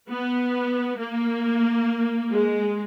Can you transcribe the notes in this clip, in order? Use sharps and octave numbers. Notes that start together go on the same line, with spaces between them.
B3
A#3
G#3